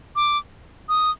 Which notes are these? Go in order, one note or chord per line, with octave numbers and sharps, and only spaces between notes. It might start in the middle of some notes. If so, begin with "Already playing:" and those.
D6
D#6